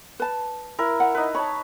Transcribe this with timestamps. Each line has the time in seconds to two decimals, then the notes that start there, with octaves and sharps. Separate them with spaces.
0.20 B4 A5
0.79 E4 A#4
1.00 F#5
1.15 D#4 B4
1.35 C#5 A5 B5